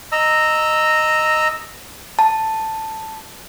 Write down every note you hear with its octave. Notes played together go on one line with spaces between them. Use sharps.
D#5 A#5 E6
A5